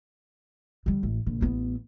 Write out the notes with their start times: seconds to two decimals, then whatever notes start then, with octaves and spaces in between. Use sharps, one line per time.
0.86 D3 G3
1.03 A1
1.26 A#1 D3
1.41 A1 B3